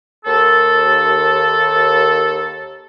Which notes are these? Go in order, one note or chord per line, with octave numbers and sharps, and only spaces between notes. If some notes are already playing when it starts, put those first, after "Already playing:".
D#2 A4